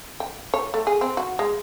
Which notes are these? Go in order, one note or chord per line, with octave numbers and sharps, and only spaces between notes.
G5
C#5
A3
G#4
C4
F#4
G#3